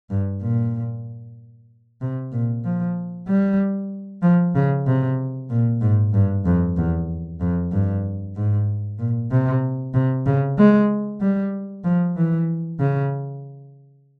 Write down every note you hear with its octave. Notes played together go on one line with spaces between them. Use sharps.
G2
A#2
C3
A#2
F3
G3
F3
C#3
C3
A#2
G#2
G2
F2
E2
F2
G2
G#2
A#2
C3
C3
C#3
G#3
G3
F3
E3
C#3